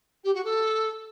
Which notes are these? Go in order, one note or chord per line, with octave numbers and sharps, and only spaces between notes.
G4
F#4
A4